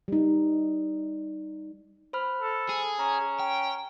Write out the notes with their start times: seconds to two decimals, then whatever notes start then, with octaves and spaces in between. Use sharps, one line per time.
0.08 G3 D#4
2.13 C5 B5 F6
2.41 A4
2.69 G#4
2.99 C#4 A#5
3.40 G5